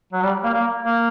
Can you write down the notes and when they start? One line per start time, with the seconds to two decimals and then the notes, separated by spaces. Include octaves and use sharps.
0.13 F#3
0.23 G3
0.44 A#3
0.54 A#3
0.82 A#3